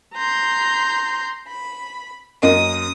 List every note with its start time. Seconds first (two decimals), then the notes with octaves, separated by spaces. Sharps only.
0.14 A#5 C6 G6
1.48 B5
2.43 F#2 A#3 D#5 D#6